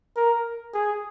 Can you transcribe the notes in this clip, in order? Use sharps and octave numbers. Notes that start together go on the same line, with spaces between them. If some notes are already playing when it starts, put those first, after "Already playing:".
A#4
G#4